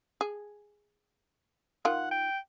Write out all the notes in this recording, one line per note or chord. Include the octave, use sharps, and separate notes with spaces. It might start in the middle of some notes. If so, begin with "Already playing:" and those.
G#4
D#3 F4 F#5
G5